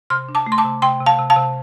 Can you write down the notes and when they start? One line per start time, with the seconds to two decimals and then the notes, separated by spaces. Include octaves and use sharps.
0.10 C3 C6 F6
0.29 D4
0.35 A5 D6
0.47 A3
0.52 C6
0.58 A5 D6
0.65 C3
0.82 C3 G5 C6
1.01 C3
1.06 F5 A5
1.19 C3
1.30 F5 A5
1.37 C3